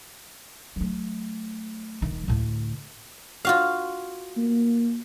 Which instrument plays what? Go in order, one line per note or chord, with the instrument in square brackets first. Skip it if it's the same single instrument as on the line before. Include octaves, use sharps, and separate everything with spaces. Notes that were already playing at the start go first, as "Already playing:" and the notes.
[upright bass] F#3 A3
D#1 D#3
D2 A2
[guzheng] F4 F#4 F5
[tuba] A#3